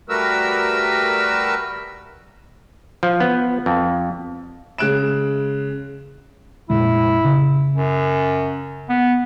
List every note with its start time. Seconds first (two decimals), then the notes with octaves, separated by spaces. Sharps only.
0.09 G3 A3 F#4 A#4 B4 E6
3.03 F3
3.20 B3
3.66 F2
4.78 C#3 G#3 F#6 D7 E7
6.70 F1 A#2 G#3 E4
7.24 C#3
7.75 F#2
8.89 B3